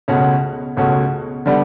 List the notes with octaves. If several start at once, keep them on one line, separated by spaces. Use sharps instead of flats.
C#2 B2 A3 C#4 F#4
C#2 B2 A3 C#4 F#4
D3 G3 B3